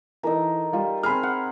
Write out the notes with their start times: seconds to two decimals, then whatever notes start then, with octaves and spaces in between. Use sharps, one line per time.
0.23 E3 D#4 A4 A#4
0.73 G3 F4
1.03 C4 G#4 B5 F6
1.23 F#5